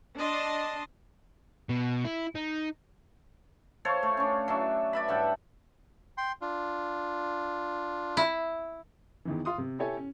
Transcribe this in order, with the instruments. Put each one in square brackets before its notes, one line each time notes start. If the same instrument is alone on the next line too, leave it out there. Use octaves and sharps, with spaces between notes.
[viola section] D4 D#5 A5 C6
[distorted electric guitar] B2
E4
D#4
[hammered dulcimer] A4 C5 C#5 F5
A3
C#4 D4
F#3 D4 E5
D5 E5 B5
G2 A4 F#5 G5
[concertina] G5 C6
D4 F4
[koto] E4
[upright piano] E2 D#3 E3
F4 C6 D#6
C3
E4 G4 A4 C#5 G#5
C#4